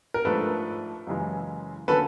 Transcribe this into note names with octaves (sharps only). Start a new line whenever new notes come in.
A#4
G#2 F3 A3 D4 A4 B4
F#1 F#2 C#3 E3 G#3
D3 F#3 A#3 C#4 A4 B4